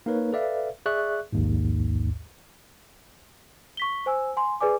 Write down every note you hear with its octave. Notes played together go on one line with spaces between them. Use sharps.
A#3 D#4 A#4 B4 C#5
A4 B4 D5 E5 F5
G#4 D5 E5 C#6 F#6
A#1 D#2 G#2
C#6 B6 G7
C5 G#5 E6
G#5 C6
G#4 B4 D5 G#5 D6